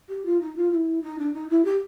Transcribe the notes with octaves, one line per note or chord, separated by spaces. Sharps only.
G4
F4
D#4
F4
F4
E4
D#4
D4
D#4
E4
G4